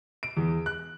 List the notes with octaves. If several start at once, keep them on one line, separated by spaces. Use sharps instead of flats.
D7
E2
F#6